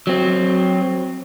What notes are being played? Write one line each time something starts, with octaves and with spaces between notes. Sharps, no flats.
F#3 C4